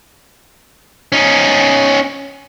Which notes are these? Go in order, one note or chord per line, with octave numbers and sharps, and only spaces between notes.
C#4 D#4